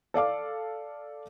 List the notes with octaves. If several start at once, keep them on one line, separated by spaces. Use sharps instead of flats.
A4 D5 F5 D6